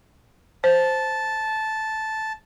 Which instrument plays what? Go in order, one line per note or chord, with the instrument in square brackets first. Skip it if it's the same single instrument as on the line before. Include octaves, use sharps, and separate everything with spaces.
[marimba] C5 [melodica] A5